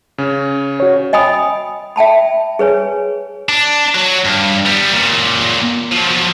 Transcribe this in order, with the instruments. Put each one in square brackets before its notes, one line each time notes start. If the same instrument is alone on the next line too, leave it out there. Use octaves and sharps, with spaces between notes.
[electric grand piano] C#3 C#4
[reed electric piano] F#4 C#5
[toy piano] D#5 G5 G#5 B5 D#6
E5 G5 A5 B5
G#4 B4 C#5 G#5
[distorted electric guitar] D4
F#3
G2
G3 B3
C#2 A#2
F3 F#3